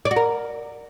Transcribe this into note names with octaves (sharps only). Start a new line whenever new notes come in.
D5
F#4
A#4